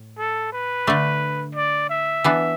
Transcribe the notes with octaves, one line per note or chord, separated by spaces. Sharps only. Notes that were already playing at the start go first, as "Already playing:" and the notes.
Already playing: A2
A4
B4
D3 A3 D4
D5
E5
E3 B3 D4